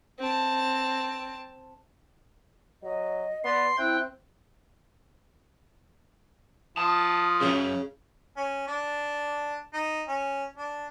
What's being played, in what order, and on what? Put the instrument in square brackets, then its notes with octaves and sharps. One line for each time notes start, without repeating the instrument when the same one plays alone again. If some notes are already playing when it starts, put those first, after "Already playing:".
[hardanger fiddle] C4 A5
[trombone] F#3 [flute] D#5
[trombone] B3 [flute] D5 [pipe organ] C6
[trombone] C4 [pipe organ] E4 G5 [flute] F#6
[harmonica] F3 D#6 [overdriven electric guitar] A5
[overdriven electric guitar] B1 F#2 [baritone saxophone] C#3
[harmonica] C#4
D4
D#4
C#4
D4